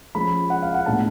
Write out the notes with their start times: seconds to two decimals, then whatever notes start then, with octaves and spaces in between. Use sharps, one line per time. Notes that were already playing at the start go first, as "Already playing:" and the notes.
0.15 F3 G#3 C#4 B5
0.50 F#5
0.62 F5
0.74 F#5
0.86 A2 G#3 B3 D4 A5